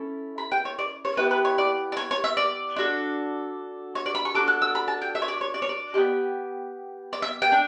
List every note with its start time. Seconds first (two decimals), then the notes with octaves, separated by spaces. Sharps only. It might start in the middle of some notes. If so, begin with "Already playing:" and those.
Already playing: C#4 E4 A4
0.38 B5
0.52 G5
0.65 C#5
0.79 D5
1.05 C#5
1.17 B3 E4 G4 B4
1.31 B4
1.45 C#5
1.58 D5
1.92 D5
1.97 C#5
2.11 C#5
2.24 E5
2.37 D5
2.76 D4 F#4 A4
3.95 C#5
4.06 D5
4.15 B5
4.25 C#6
4.34 D4 F#4 A4 D6
4.48 F#6
4.62 E6
4.75 B5
4.88 A5
5.02 G5
5.15 E5
5.22 C#5
5.28 D5
5.41 C#5
5.54 D5
5.62 C#5
5.69 D5
5.94 D4 G4
5.98 B3
7.13 D5
7.22 E5
7.42 G5
7.52 D4